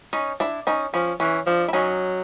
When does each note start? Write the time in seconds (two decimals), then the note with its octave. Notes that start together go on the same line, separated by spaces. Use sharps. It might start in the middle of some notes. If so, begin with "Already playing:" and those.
0.13 C#4 D#4
0.40 D4 E4
0.67 C#4 D#4
0.94 F3 C#4
1.20 E3 C#4
1.46 F3 D4
1.68 E4
1.73 F#3 C#4 D#4